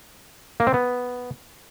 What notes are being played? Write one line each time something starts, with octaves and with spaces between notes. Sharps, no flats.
A#3
C4
B3